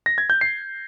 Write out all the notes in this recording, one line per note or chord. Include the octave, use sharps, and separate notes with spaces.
A#6
G#6
G6
C7